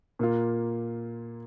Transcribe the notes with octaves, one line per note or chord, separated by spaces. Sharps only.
A#2 A#3 F4